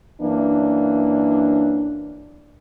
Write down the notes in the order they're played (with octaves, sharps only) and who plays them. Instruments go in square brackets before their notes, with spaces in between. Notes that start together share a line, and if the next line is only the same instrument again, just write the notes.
[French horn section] F#2 E3 A#3 D4